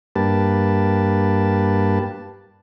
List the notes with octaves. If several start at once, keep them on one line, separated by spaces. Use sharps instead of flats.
G2 A#3 G4 B4 A5